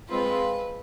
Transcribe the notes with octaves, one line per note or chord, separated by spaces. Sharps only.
G#3 C4 F4 B4